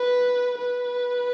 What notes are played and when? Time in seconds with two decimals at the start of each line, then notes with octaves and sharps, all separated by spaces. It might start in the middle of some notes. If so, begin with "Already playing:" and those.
Already playing: B4
0.58 B4